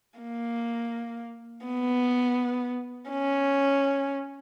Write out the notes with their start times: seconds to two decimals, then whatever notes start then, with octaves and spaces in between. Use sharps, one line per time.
0.19 A#3
1.65 B3
3.10 C#4